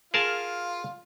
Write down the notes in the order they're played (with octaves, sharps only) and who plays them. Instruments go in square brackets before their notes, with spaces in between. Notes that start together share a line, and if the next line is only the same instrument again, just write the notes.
[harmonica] F4 [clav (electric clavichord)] G#4 A#4 A5